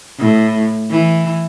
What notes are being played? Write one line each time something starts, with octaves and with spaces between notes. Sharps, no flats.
A2
E3